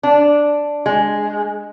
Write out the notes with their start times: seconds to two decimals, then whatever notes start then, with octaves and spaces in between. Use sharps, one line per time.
0.03 D4
0.86 G#3